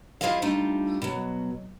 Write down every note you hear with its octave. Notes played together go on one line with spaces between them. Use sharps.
E4 F4 G#4 C5 D#5 F5
G3 A3 D4 D#4 F4
B2 F#3